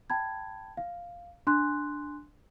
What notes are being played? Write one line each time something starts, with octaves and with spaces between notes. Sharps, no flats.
G5 A5 B5 G#6
F5
D4 G#5 C6 F#6